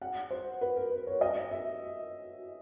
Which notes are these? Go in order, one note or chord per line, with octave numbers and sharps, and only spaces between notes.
F#5
C5
B4
A#4
B4
C#5
D#5
E5